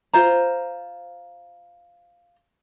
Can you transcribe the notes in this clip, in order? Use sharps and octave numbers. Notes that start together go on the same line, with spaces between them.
F4 C5 A#5